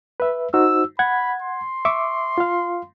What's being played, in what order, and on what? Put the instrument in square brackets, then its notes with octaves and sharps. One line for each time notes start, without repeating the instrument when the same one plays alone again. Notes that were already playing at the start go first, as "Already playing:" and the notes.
[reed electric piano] B4 E5
[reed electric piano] D#4 F#4 C5 [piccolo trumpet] E6
[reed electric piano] F#5 G#6 [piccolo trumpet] B5
[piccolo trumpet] C6
[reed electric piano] E5 C#6 D6
F4 F5